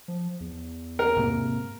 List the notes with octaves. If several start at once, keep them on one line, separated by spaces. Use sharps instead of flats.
F3
E2
A#4
G#2 C3 A#3